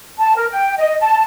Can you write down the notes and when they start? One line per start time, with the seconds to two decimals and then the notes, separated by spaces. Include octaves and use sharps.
0.19 A5
0.37 A#4
0.52 G5
0.78 D#5
1.00 A5